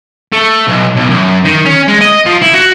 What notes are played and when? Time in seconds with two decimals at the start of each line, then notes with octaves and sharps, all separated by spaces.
0.33 A3
0.68 B1
0.96 B1
1.10 F#2
1.45 D#3
1.66 C#4
1.88 G#3
2.01 D#5
2.26 F3
2.42 E4
2.53 F#4